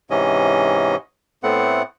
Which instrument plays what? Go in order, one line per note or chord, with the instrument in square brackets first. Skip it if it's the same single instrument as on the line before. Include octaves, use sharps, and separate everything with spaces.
[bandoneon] G#2 C3 E3 C#4 D#5
A2 A3 B3 C4 F#5